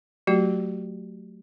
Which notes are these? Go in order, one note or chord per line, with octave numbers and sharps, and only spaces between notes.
F#3 A3 F#4 G4